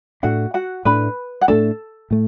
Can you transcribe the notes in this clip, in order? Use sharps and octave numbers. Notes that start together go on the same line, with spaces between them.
A2 A3 D4 F#4 F#5
F#4 F#5
A2 A3 D4 B4 B5
F#5
A2 A3 D4 A4 A5
A2 A3